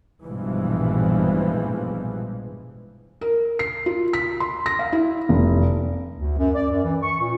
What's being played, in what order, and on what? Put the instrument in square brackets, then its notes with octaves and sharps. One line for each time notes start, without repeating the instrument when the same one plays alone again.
[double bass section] A#1 G2 B2 E3 F3 G#3
[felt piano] A#4
C7
F4
B6
C6
A#6
F5
E4
F1
[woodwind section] D2
F#2
D5
F#2
E3
C#6
A#2